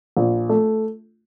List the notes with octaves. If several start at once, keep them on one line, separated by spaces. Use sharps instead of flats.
A#1
A3